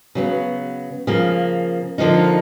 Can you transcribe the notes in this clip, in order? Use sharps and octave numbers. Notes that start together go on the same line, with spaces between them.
C#3 F#3 B3
C#3 F3 A#3
D3 F3 A#3 D#4